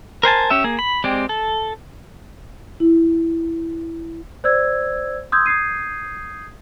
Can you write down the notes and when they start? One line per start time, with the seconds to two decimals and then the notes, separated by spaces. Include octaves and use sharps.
0.23 A#4 C5 G#5 A5
0.50 C#4 G4 E5
0.64 A#3 G#4
0.79 B5
1.04 G#3 C4 G4 D5
1.29 A4
2.80 E4
4.44 C5 D5 E6 G#6
5.32 C6 D#6 E6 G6 G#6
5.46 D#6 G6 G#6 C7 D#7